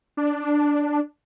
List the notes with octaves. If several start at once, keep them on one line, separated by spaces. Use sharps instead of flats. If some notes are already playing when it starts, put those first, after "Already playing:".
D4